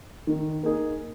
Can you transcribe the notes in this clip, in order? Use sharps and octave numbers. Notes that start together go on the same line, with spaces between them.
D#3
A#3 D#4 G#4